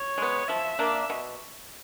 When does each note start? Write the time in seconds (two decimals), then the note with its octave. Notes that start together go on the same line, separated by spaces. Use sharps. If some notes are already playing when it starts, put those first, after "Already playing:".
Already playing: C#5
0.18 G#3 B3
0.48 F3 E5
0.79 A#3 D4
1.10 B2